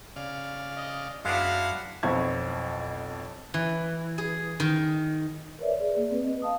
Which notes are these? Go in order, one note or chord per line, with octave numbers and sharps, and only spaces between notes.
C#3 D5 F5
D#5
F#2 G#3 B3 D4 E4 F#4 F5 F#5
B1 F2 E4 C5 C#6 G#6
E3
G#4
D#3
A#4 B4 C#5 D5 E5
G#4 D5
A#3
C4 B4
D#5
F5 A5 D#6